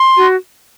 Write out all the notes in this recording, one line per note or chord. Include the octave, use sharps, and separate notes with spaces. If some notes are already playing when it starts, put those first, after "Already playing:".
Already playing: C6
F#4